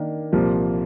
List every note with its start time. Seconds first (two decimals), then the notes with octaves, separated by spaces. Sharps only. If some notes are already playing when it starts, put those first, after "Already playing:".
Already playing: D#3 A#3 D4
0.32 C2 A#2 F3 A#3